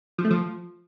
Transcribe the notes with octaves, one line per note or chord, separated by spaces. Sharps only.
F3
A3
F3